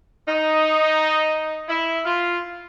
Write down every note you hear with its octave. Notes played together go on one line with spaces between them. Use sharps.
D#4
E4
F4